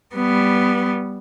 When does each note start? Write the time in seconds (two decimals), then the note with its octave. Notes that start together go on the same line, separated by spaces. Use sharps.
0.15 G3 B3